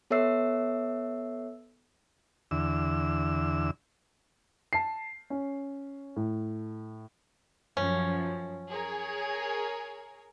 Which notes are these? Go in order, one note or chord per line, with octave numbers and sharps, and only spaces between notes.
B3 A4 C#5 E5 E6 C7
E2 D3 E6
A5 C7
C#4
A2
F#2 F3 C#4
G#4 A#4 C#5